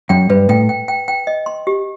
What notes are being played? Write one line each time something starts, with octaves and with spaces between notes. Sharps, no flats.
F#2 G5
G2 B4
A2 G5
G5
G5
G5
D#5
C6
G4